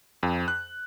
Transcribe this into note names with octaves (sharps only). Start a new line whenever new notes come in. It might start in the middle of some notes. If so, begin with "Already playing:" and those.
F2
F#6